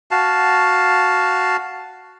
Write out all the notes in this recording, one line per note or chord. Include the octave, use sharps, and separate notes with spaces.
F#4 F5 A5